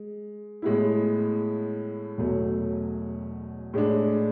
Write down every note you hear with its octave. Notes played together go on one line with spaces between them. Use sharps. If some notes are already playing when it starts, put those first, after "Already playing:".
Already playing: G#3
A2 G#3 B3 E4
E1 E2 B2 F#3 A3
A2 G#3 D4